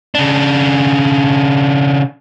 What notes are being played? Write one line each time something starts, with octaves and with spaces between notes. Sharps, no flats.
C#3 D4